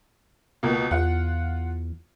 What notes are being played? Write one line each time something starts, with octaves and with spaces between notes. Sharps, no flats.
C#2 B2 A#3
E2 F4 F#5